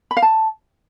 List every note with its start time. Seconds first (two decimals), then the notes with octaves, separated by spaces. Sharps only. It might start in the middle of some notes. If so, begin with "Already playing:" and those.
0.11 B5
0.17 F5
0.22 A5